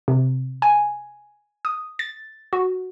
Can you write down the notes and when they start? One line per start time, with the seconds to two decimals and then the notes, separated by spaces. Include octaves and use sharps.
0.08 C3
0.62 G#5
1.65 D#6
1.99 A6
2.53 F#4